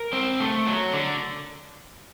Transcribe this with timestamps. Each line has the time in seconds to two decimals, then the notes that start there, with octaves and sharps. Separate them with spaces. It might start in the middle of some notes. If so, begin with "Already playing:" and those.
Already playing: A#4
0.13 C4
0.40 A3
0.67 F#3
0.93 D3